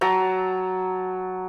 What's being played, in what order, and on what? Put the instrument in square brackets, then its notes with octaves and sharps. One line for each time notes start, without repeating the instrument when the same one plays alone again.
[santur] F#3 A5 A#5